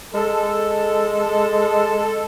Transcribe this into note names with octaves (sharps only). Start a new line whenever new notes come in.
G#3 A4